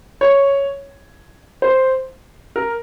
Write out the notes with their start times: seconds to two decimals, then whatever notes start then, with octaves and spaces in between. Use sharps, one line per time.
0.21 C#5
1.62 C5
2.56 A#4